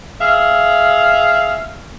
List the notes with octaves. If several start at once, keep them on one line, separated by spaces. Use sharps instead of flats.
G#4 E5 F5